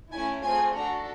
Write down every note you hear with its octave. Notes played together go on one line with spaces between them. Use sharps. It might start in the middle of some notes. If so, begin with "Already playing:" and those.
A3 C#4 E4 G#5
A3 C4 F4 G#4 G#5
D4 F#4 A4 A#5